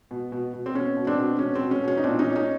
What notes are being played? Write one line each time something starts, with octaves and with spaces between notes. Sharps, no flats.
B2
B2
B2
C4
B2 C#4
B2
C4 D4
B2
B2 C#4
C4
B2
C#4
B2
C#4
D#4
A#2 C4 D4
C#4 D#4
A#2
C#4 D#4